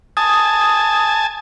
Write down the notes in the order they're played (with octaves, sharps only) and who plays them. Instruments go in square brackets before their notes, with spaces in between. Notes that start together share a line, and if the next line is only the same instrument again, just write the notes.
[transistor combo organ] G#5 A5 [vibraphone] D#6